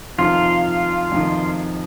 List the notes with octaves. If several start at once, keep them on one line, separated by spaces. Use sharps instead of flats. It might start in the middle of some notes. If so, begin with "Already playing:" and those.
F2 C3 D#3 F4
F2 C3 D#3